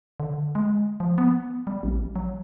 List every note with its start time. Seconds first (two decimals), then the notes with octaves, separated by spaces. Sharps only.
0.20 D3
0.55 G#3
1.00 F3
1.18 B3
1.67 G3
1.83 A1
2.16 F#3